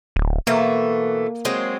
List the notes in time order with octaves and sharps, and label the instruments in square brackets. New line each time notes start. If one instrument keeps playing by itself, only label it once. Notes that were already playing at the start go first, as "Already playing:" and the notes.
[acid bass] D1
[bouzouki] B2 E3 A3 [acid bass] A#3
[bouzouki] F#3 G#3 C4